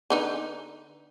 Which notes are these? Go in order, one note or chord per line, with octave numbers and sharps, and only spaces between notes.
D3 D#4 B4